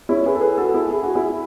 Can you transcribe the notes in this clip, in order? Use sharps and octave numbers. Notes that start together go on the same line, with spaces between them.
C#4 E4
G#4 B4
A4
G#4 B4
F#4 A4
E4 G#4
G#4
F#4
E4 G#4